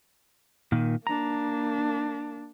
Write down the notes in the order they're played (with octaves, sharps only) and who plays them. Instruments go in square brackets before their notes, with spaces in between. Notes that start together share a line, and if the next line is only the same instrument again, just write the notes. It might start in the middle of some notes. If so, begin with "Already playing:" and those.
[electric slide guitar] A#2 D#3
[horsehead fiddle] A#3 D4 [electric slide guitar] A#5